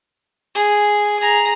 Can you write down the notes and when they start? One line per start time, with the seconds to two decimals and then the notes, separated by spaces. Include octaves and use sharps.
0.55 G#4
1.19 G#4 A#5